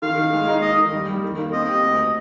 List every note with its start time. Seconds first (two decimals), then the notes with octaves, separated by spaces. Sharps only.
0.02 D#3 F5
0.17 D#3
0.33 G#3
0.48 D#4
0.62 D#4 D#5
0.77 D#3
0.92 G3
1.08 G3
1.23 D#3
1.38 A#3
1.53 C4 D#5
1.68 G4
1.82 D2